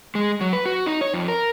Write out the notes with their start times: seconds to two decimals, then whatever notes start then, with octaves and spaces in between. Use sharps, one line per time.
0.15 G#3
0.41 F#3
0.53 B4
0.66 F#4
0.86 D#4
1.01 C#5
1.14 F2
1.28 A#4